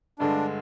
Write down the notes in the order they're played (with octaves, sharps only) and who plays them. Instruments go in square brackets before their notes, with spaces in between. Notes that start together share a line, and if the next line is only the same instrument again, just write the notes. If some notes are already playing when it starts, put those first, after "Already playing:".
[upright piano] G2 D3 G#3 [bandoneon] D4